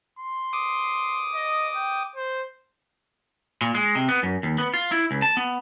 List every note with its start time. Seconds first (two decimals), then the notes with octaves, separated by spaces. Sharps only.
0.19 C6
0.53 D6 D#6
1.34 D#5
1.75 G5
2.16 C5
3.61 A#2
3.75 G#3
3.95 C3
4.09 B3
4.23 F#2
4.43 D#2
4.58 B3
4.74 F4
4.92 E4
5.11 C#2
5.22 A5
5.37 B3